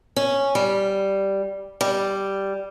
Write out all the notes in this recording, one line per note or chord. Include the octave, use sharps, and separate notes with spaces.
C#4
G3
G3